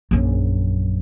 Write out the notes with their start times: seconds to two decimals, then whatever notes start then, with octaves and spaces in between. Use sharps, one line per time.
0.11 A#1 F#2